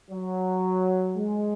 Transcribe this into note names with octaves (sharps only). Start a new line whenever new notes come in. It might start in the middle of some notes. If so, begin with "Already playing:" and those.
F#3
G#3